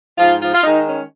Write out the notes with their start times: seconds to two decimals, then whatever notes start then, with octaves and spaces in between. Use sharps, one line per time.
0.18 G#2 F3 F4
0.40 F3 F4
0.54 F4
0.63 D#3 G#3 D#4
0.86 C#4